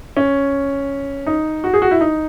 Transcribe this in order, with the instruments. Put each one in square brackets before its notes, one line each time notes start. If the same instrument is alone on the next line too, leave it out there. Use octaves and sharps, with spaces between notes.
[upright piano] C#4
D#4
F#4
G#4
F#4
E4
D#4